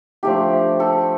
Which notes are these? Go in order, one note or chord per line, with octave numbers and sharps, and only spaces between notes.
F3 A3 D4 G4
A4